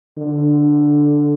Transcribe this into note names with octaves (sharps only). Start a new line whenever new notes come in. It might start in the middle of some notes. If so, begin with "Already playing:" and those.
D3